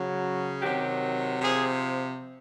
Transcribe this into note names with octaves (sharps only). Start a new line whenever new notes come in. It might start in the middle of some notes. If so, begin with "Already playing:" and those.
Already playing: C#3 F#3
C3 D#3 F#3 G4
C3 F3 G#4